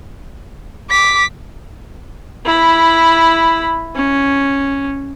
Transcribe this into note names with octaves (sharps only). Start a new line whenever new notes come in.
D6 B6
E4 B5
C#4